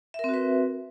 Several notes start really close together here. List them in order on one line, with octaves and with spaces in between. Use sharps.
E5 A#4 C4 F#4 B4